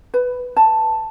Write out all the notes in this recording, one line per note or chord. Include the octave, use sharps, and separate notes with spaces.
B4
A5